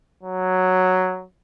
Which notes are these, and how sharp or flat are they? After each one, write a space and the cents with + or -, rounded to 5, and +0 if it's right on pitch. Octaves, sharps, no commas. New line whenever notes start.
F#3 +0